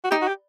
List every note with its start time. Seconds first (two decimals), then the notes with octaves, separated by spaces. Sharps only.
0.04 F#4
0.11 D#4 G4
0.22 F#4
0.28 G4